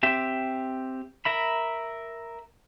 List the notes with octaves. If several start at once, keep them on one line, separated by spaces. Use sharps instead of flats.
C4 G4 E5
A#4 E5 B5